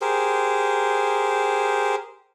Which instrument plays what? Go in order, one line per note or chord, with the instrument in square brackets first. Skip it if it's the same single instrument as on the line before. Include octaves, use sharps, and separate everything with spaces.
[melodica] G4 G#4 A#4 C5